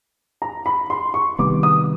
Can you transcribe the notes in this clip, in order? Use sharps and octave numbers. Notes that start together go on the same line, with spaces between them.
A#5
B5
C6
C#6
C3 D#3 G3 B3 D6
D#6